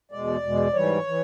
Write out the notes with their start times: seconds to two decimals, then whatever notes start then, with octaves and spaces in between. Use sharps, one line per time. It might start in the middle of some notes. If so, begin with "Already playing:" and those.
0.12 E2 B2 G#3 D5
0.43 E2 B2 G#3
0.74 G#2 E3 G3 C#5
1.07 E3